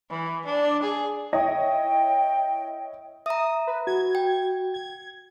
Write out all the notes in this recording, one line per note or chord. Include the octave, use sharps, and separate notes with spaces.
E3
D4
G#4
E4 C#5 D#5 G5
E5 A#5 D#6
B4
F#4 G#6
G5
G#6